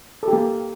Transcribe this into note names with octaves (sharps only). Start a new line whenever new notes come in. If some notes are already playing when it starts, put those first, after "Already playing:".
A4
G4
A#3